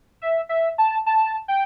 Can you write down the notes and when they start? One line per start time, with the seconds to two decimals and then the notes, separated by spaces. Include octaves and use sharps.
0.22 E5
0.49 E5
0.78 A5
1.06 A5
1.48 G5